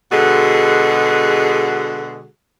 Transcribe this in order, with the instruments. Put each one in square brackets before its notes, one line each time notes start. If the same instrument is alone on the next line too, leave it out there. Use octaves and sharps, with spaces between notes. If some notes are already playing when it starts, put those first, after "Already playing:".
[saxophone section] B2 D3 G#3 F#4 G#4 A4